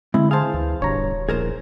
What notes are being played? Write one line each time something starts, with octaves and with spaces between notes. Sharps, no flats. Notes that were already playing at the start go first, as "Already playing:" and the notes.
D3 G#3 C4 E4
G#4 C5 F5 A5
D2 E3
D1 G1 G2 B2 C#5 A#5
A#1 E2 G#4 A#4 C5